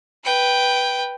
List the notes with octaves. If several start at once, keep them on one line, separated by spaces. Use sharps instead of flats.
B4 G5